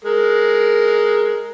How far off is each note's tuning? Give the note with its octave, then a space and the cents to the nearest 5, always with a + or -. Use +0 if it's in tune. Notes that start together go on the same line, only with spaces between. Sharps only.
G#3 +10 A#4 +0